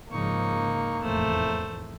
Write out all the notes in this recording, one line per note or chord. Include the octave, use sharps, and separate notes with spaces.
G#2 C#3 F3 A#3 D#4 C#6
F1 E2 A2 A3 C5